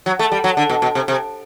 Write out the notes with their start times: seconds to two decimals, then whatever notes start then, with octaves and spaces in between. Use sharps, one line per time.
0.06 F#3
0.19 A3
0.32 G3
0.44 F#3
0.57 D3
0.69 B2
0.82 B2
0.95 C3
1.08 C3